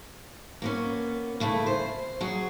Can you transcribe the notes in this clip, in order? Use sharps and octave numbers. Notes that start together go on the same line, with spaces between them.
A#3 B3 C#4
C#3 A3 E4 B4
C5
F#3 F#4 G#4